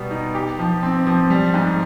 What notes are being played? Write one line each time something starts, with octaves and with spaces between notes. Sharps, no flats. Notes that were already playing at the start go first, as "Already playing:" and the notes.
Already playing: B2 G3 B3
D#4
G4
F3
C4
F3
G3
G#2